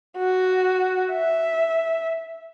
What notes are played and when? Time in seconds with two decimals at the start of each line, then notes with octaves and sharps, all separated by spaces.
0.18 F#4
1.13 E5